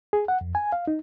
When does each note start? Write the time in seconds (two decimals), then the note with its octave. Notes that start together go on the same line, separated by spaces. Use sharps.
0.13 G#4
0.28 F#5
0.41 F2
0.55 G#5
0.72 F5
0.88 D#4